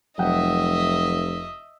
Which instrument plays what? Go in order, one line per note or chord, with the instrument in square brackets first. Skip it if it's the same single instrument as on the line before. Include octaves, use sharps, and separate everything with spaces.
[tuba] F1 [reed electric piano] F#3 F#5 G5 [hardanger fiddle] D#5 E5